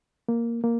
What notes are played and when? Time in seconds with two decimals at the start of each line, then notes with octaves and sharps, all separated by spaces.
0.28 A#3
0.64 A#3